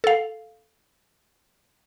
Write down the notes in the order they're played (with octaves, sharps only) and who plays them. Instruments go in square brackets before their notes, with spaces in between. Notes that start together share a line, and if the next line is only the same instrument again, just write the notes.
[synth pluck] A4 F5